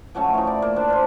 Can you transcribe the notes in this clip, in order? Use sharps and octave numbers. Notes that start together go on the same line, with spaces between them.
F3 F#3 A3 C#4
E3 C#4 D#4
D5
A#3
D4 F4 B4 C5
D4 F4 C5